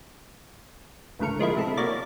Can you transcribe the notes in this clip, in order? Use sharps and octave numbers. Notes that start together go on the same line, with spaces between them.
G1 C#2 A2 D3 A#4 C#6
F3 G#3 A#3 E4
C3 A4 B5
B2 A#3 C#5 D5 A#5 A6